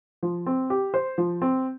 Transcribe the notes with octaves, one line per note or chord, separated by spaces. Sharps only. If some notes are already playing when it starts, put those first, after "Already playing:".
F3
C4
G4
C5
F3
C4